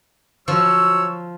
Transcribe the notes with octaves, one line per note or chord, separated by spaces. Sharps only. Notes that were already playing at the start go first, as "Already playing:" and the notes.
F3 F#3 C#5 E6